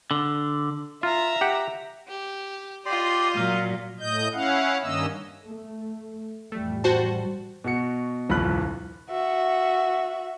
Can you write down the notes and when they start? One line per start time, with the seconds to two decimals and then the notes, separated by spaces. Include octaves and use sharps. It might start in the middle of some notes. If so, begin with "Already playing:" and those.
0.11 D3
1.03 F4 E5 A#5
1.41 G4 F#5
2.07 G4
2.86 F4 G4 D5 D#5 C6
3.36 A#2 F#3 F5
4.00 A2 D#5 G6
4.33 C#4 E4 F5 F#5
4.83 G2 D#3 A#3 C#4 D#5 E6
5.45 A3
6.52 A1 F2 G3 A3
6.84 F#4 C5 A5
7.64 B2 F#4 C#7
8.29 D#1 C2 G2 F3 B5 F#6
9.10 F#4 E5